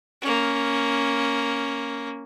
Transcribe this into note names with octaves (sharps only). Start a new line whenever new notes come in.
A#3 C#4